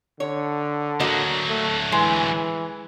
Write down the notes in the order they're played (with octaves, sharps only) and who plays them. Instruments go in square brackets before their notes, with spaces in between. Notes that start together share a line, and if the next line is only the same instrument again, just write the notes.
[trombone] D3 [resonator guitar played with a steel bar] C#5
[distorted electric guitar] D2 F#3 [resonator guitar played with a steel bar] A#3 F#4 D#5
[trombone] A3
[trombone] E3 [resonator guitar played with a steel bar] G#3